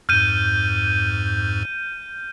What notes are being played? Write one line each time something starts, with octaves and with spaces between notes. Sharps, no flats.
F2 G#2 F6 G6 D#7